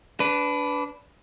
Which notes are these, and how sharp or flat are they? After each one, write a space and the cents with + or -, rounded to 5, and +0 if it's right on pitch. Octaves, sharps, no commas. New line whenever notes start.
D4 -20 B4 +10